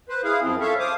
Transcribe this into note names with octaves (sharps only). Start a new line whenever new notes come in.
B4 C5
E4 G#4 F5
F#2 F3 C4
A4 C#5 E5 F5
C5 F5 D6 D#6